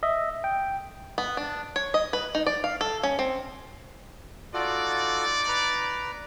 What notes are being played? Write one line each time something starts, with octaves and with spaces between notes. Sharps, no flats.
D#5 E5
G5
B3
D4
C#5
D#5
B4
D#4
D5
F5
A4
C#4
C4
D#4 F4 F#4 A4 D5
B4 A#5